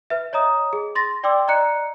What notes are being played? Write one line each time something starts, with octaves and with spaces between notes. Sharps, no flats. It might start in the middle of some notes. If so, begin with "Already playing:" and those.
B4 E5
C#5 D#5 A#5 D#6
G#4
C6 A6 A#6
D5 G5 C6 D6 E6
D5 D#5 A#5 F#6 C#7